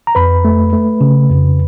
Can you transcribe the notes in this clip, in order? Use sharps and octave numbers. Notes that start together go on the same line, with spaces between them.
A#5
F2 B4 B5
A3
A3
C#3
F2